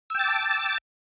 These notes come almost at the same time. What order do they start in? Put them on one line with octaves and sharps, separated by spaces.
E6 G5 A6 D6 A5